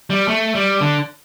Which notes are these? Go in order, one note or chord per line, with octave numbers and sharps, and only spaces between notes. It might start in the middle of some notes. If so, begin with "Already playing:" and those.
G3
A3
G3
D3